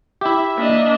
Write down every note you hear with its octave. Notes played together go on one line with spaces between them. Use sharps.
E4 G4 E5
A#3 D4 D#5